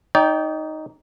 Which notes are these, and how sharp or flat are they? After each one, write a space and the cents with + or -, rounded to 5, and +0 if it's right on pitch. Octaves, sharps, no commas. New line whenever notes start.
D#4 +0 D5 -40 G5 +0